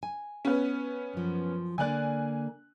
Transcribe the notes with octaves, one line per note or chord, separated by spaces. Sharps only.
G#5
B3 C#4
F#2 F3
D3 A#3 D5 G#5 F#6